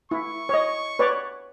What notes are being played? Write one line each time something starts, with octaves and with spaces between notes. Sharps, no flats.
E4 C#6
C#5 D#5
B4 C#5 D5